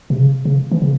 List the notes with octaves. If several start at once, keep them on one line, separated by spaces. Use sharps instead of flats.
C3
C#3
C#3
E3
C#3